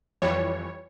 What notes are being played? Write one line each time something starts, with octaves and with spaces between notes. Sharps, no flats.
F2 E3 G3 C#5